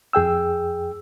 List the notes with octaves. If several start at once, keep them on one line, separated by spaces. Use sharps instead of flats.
F2 G#4 G5 E6